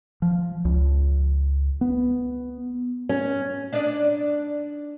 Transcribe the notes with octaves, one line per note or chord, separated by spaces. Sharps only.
F3
C#2
B3
C#4
D4 D#4 D5